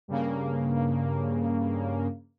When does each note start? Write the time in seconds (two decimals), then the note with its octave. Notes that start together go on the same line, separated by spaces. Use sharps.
0.08 G2 C#3 A#3